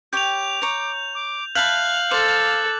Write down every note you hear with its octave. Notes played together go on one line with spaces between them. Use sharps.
G4 C#5 G5 D6 G6 F7
C#5 A#5
D6
E5 F5 A5 B5 F#6 G6 F#7
A4 C5 D6